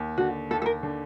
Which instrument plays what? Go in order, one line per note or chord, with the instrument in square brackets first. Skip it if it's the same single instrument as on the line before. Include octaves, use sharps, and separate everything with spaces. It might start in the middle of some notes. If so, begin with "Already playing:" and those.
Already playing: [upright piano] D#2
[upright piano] D3 [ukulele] F#4
[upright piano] D#2 [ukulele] A4
[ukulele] A4
A#4
[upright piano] D3